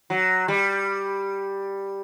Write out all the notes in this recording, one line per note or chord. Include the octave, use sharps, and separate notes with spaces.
F#3
G3